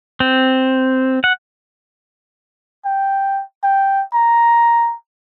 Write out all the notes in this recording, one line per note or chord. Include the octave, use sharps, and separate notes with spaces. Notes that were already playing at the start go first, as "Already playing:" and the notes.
C4
F#5
G5
G5
A#5